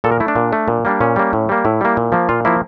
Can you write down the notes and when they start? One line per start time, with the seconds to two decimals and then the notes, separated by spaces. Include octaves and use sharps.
0.04 A#2 A4
0.12 A#4
0.20 A3 E4
0.28 D4
0.35 A#2
0.53 A3
0.68 A#2
0.85 G3 A#3 D4
1.01 A#2 C#4
1.16 G3 A#3
1.33 A2
1.49 G3 A#3
1.65 A2 E4
1.81 G3 A#3
1.97 A#2
2.12 F3 A#3
2.29 A#2 F4
2.45 F3 A#3 E4